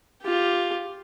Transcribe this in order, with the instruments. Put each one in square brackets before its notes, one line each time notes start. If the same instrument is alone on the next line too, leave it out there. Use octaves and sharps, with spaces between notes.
[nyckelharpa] F4 G4